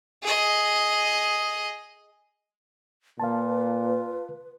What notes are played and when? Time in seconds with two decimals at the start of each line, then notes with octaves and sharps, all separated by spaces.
0.22 G#4 D#5
3.20 A#2 F4 B4 F5 A5